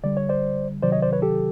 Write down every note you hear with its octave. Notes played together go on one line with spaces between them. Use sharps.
D3 G3 D5
C#5
C5 D5
C3 D#3 F#3 C5 D5
C#5 D#5
C5 D5
B4 C#5
G4 A4